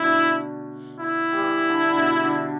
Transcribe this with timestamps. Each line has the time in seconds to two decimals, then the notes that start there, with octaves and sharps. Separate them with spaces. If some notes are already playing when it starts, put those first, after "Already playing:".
Already playing: B2 D3 A3 E4
1.00 E4
1.33 G3
1.42 E3
1.69 D3
1.91 D3
1.97 B2
2.24 D3